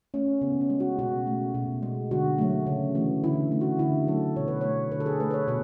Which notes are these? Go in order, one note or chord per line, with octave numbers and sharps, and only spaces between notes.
A3 C#4
C#3 B3
C#4
G#3
F#4
B2 F#4
A3
B2
G#3
D3 F#4
F#3 A3
C#3
E3 A3
D3 E4
A3
F#4
D3 E4
F#3 A3 A4
B2 C#5
B4
A3 C#5
D3 B4
A4
G#4
A3 B4
B4
C#5
B2 B4